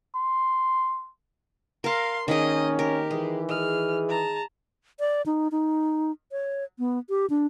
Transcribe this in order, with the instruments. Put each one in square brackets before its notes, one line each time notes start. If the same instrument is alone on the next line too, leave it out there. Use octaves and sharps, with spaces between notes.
[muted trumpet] C6
[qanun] A#4 A5 [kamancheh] F5 C6
[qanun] D#3 G#4 [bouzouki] A#3 C4 D#4 [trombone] C#4 [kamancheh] D#5
[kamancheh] G4 [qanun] A#4
[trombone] E3 [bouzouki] G#3
[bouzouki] G#3 G#4 [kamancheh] F6
[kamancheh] A5 A#5
[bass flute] D5
D#4
D#4
C#5
B3
G4
D4